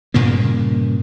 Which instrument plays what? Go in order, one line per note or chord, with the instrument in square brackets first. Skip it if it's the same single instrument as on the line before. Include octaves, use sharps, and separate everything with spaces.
[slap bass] G2 A#2 C#3 A#3